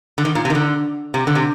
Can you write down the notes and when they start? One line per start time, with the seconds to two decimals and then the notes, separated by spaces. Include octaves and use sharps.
0.18 D3
0.25 D#3
0.35 A#2
0.45 C3
0.50 D#3
0.55 D3
1.14 C3
1.27 D3
1.35 C3